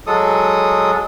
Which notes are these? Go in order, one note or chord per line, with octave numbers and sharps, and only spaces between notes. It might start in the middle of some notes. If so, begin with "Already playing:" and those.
F#3 G#3 A4 D#6